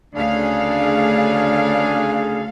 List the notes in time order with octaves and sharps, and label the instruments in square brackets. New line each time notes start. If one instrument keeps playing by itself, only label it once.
[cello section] D2 A4 F5 [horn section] C#3 D4 G#4